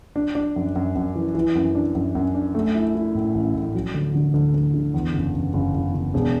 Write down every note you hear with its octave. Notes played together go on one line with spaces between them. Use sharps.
D4
D4
F#2
F#2
F#2
E3
E3
F#2
D4
F#2
F#2
D4
A3
E4
E4
A2
A1
A2
F#3
D2
D3
D2
D2
D3
E2
F#1
F#1
F#1
F#1
F#1
E1